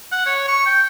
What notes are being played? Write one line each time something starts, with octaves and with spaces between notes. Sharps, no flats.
F#5
C#5
C#6
G5